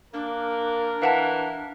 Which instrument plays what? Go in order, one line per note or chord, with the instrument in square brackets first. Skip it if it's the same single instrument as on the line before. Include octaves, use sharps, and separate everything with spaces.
[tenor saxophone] A#3 [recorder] D4 [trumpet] A#4
[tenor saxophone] E3 [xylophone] F5 F#5 A5